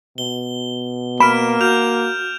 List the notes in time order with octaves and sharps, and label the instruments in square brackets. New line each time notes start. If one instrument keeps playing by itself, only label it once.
[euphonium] B2 [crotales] G7
[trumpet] A#3 [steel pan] B5 [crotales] F6 D7 E7
[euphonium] F#4 [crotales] F6 G6 F7